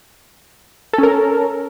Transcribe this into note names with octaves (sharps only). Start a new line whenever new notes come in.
C#4 A4 A#4